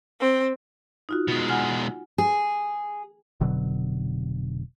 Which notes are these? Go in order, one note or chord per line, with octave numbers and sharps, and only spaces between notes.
C4
D#4 F4 F#4
B2 G#3
F#5 G#5 F6
G#4
F1 B2 D3 F#3